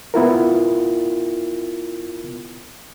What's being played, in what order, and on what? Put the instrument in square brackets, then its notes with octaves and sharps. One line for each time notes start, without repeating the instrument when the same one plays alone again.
[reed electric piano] B3 E4 F4 A#4